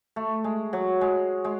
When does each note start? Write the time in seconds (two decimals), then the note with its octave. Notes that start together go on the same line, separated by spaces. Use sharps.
0.16 A3
0.44 G#3
0.73 F#3
1.01 G#3
1.44 G#3